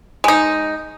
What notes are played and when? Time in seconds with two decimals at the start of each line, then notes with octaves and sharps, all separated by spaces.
0.24 G#3 D#4